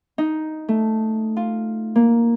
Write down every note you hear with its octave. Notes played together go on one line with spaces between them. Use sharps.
D#4
A3
F4
A#3